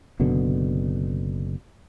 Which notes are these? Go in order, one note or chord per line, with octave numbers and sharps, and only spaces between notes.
F#1 B2 D3